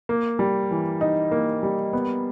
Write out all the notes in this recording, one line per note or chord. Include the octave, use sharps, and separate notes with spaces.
A#3
G3
E3
D#4
A#3
G3
B3